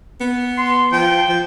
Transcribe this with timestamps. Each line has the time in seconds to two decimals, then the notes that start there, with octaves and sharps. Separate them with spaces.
0.20 B3
0.58 C6
0.92 F3 G5
1.29 F3